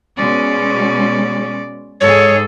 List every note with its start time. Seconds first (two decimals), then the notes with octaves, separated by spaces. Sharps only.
0.17 B2 G#3 C#4 D5
2.01 G#2 G#4 A4 C#5